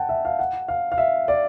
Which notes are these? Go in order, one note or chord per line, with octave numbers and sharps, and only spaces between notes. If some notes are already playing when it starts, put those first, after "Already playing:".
Already playing: F#5 G5 A5
E5
F5
F#5
F5
F5
E5
D5